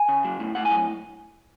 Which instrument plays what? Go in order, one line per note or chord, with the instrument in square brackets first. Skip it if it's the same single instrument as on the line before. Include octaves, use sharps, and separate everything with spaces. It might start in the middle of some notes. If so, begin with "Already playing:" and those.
Already playing: [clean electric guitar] G#5
C#3
F#3
A2
A2 F#5
G#5
F#3